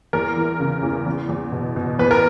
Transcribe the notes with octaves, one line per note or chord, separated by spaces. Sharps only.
E2 A#4
E3
C#3
E2
E2
E2
B2
B2
E2 B4
A#4